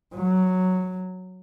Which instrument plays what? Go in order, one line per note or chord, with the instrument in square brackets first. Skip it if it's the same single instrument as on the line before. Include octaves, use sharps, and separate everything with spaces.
[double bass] F#3